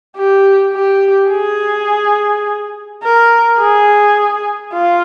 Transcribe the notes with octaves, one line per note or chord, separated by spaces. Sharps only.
G4
G4
G#4
A#4
G#4
F4